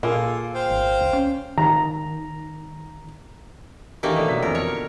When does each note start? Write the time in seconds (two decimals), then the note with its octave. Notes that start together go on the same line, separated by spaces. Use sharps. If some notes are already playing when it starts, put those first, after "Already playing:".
0.03 A#2 A#3 F4 G#4 A4
0.54 C5 F5 G5
0.70 G#1
1.01 C#2
1.13 C#4
1.58 D#3 A#5
4.03 D#3 E3 A3 A#3 D4 G4
4.16 B2 D3 G3
4.28 B1 B6
4.43 F2 E3 A#4
4.55 A#4 C#5 F7